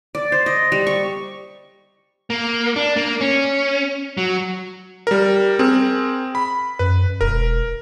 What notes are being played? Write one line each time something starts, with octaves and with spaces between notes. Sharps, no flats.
D5
C5
D#5
G3
C#6
A#3
D4
A#3
C#4
F#3
G3 A#4
C4 G#4 A#4
B5
F#2 B4
E1 A#4